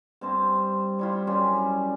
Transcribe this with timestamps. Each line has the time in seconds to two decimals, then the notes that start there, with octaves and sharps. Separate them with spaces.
0.21 G2 C4 A5 C6
0.99 G3 E4 F4
1.27 F#2 G3 C#4 C6